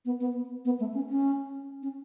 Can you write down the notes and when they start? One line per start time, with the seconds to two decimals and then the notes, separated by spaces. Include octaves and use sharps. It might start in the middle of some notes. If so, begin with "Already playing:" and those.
0.05 B3
0.20 B3
0.65 B3
0.80 A3
0.94 C#4
1.09 C#4
1.83 C#4